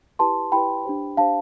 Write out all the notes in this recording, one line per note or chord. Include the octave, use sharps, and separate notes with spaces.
E4 G4 B4 A5 C6
E4 G4 B4 G5 B5
D4 G4 C5
D4 G4 C5 F5 A5